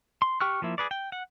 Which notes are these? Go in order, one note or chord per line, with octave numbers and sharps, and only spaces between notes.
C6
G4 G5 C#6 F6 F#6
F3 A#3 E4
G#4 B4 D5
G5
F#5